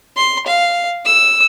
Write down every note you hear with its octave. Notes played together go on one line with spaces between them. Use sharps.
C6
F5
E6